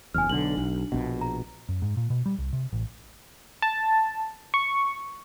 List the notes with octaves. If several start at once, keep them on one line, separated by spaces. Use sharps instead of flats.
F#1 E2 G#5 F6
B1 D3 D4 F#7
B1
A#1 B2
A#5
F#2
G#2
A#2
B2
G3
C2
C3
A1
A5
C#6